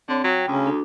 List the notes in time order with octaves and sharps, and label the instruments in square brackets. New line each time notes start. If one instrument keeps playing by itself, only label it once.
[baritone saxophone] D3 [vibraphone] C4 C#5
[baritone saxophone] F#3 [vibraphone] G5
[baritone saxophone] D2 [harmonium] C#3 C#4
[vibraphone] D4 F#4 A4